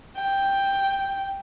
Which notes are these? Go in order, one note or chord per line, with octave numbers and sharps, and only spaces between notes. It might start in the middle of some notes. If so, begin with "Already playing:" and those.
G5